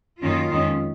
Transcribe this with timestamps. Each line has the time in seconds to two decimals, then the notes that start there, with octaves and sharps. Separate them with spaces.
0.21 F#2 D#3 A#3 C#4 F4
0.50 F2 D#3 G#3 C#4